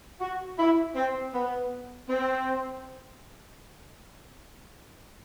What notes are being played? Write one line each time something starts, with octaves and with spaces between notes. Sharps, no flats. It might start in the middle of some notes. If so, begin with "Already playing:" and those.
F#4
E4
C4
B3
C4